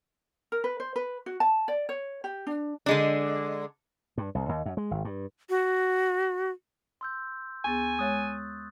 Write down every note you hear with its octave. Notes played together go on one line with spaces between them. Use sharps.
A#4
B4
C5
B4
F#4
A5
D5
C#5
G4
D4
D3 G#3 D4
G2
C2
D#2
F#2
G#3
G#1
G2
F#4
C6 E6 G6
D2 B3 G#4 G#5 C#6 A6
G#3 C#5 F5 D#6 F#6 A6